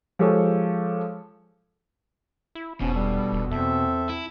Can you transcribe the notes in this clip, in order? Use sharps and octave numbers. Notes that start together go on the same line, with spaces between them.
F3 G#3 G4 A4 C#5
E4
E1 G#2 B2 F3 C#4
G3 B3 D4 A4
D#1
E2 C4 A4 E5
E4